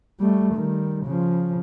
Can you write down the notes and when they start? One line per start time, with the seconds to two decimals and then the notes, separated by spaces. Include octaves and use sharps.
0.20 G3 A3
0.54 D#3 G3
1.05 C#3 F3